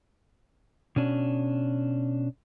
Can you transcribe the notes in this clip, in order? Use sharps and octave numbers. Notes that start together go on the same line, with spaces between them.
B2 C#4 D4